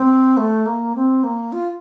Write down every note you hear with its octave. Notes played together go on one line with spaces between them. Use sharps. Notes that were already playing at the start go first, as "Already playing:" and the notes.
Already playing: C4
A3
A#3
C4
A#3
F4